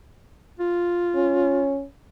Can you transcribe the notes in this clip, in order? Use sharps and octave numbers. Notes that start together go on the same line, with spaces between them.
F4
C#4